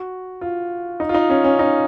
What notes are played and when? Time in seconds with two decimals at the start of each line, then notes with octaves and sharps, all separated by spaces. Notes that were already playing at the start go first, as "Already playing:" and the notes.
Already playing: F#4
0.41 F4
1.00 D#4
1.09 F4
1.14 D#4
1.30 C#4
1.44 C#4
1.59 D#4